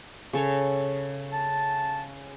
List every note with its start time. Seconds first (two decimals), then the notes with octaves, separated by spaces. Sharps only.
0.33 C#3 A4 C#5
1.33 A5